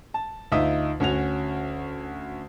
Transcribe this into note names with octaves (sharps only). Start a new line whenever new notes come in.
A5
D2 D#4 F4 E5 D#6
D2 C#4 F#4 F7